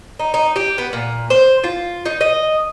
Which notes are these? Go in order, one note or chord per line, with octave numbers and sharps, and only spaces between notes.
D#4
D#4
G4
B3
A#2
C5
F4
D#4
D#5